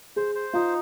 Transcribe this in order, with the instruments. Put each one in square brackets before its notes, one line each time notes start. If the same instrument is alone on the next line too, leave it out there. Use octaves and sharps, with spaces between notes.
[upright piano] G#4 [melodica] C5
[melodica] C5
[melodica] D#4 [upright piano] F4